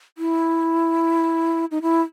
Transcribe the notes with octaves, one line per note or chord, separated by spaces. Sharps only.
E4
D#4
E4